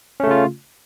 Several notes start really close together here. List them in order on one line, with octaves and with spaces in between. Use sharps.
C#4 A3 C#3 F4